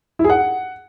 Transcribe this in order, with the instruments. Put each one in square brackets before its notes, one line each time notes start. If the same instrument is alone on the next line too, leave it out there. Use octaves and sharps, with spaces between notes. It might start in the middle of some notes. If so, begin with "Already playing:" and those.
[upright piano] E4
G#4
F#5